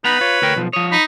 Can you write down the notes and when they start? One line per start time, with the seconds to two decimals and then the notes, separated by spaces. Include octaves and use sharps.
0.04 B3 D#4 B4 A#5 B5
0.21 F4 C#5
0.42 D2 A#4 G5
0.56 B1 F3
0.73 F3 C#5 D#6
0.92 D#4 B5